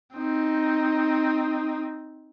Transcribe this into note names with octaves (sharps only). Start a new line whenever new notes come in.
C4 D#4